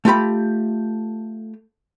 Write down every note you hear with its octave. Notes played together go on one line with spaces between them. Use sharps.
A3 F4 G4 B5